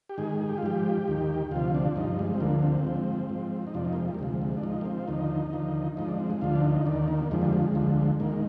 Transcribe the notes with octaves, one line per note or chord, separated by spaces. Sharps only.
G4
G#2 D#3 G#4
G#4
G4
F4
G#2 F3 G4
D#2 D#3
D2 C3 F3 F4
D4
G2 F3 D#4
G#3
C4
D2 D3 F3 A#3
C4
G#2 F3
G#2 F3
D#4
F2 C3 F3 D4
D#4
A#3
G#3
G3
A#3
D2 C3 F3 G#3
G#3
D4
G#2 F3 D#4
A#3
C4
F4
D#2 D3 F3 D#4
D#2 D3 F3
G#2 F3 D#4
D4
C4
G#3
D2 D3 F3 F4
D4
D#4
D#2 D#3 D4
A#3
F2 D3 F3 G#3
G3
G#3
D2 D3 F3
G#2 D#3 A#3